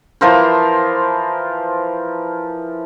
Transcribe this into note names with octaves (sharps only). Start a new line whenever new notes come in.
E3 F3 A#4 C5